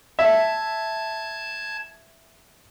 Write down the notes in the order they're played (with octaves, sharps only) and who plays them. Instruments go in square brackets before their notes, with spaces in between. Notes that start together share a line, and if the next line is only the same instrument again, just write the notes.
[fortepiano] E5 [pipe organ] A5 G#6